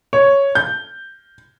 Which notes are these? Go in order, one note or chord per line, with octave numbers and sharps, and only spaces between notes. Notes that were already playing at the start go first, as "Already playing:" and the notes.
C#5
G6